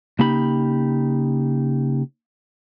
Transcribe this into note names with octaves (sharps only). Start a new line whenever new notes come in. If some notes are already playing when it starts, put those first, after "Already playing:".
C#3 A#3 D#4 G4 B5